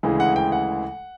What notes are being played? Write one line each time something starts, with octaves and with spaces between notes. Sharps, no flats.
D2 C#3 E3 G#3
F#5
G5
F#5